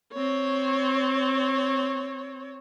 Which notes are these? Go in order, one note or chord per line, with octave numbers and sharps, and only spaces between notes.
C4 C#5